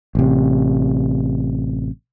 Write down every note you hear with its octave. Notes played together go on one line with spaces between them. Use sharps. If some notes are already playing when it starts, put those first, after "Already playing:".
A1 C3